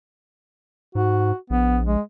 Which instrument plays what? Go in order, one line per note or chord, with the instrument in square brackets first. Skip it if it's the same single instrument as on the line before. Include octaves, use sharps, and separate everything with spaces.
[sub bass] G#2 [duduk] F#4
[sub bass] A#1 [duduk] B3
[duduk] G#3